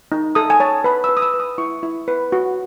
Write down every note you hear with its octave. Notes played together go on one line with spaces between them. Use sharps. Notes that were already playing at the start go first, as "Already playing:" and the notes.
D#4
A4 D#6
G#5
C#5 A5
B4 B5
E6
B4
D#6
E6
B4
D#6
E4 C#6
E4
B4
F#4